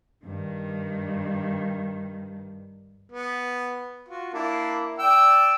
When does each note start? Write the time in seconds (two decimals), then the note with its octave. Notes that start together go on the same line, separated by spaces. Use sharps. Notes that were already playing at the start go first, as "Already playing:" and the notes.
0.25 G2 D#3
3.11 B3
4.08 F4 F#4
4.34 A#3 D4 E4
4.99 D5 G5 E6